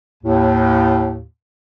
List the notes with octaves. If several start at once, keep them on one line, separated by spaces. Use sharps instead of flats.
D#2 A2